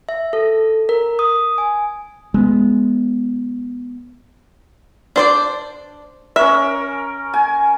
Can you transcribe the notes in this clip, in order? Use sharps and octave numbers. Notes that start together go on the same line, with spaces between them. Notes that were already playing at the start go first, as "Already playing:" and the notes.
E5
A4
A#4
D#6
G#5
G#3 B3
D4 C5 D5
C#4 A#4 E5
G#5